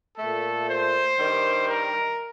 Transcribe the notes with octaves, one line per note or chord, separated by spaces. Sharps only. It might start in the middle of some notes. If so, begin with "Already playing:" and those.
A#2 A3 A4
C5
G2 D#3 G3
A#4